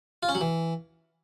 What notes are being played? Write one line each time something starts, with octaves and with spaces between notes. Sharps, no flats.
F4
C#4
F#3
E3